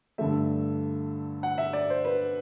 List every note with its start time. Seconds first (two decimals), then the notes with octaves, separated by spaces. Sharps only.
0.18 G2 D3 A3 E5
1.43 F#5
1.58 E5
1.73 D5
1.90 C5
2.05 B4